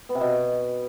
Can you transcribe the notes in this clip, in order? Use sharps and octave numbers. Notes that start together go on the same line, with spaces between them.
B3
C3
B2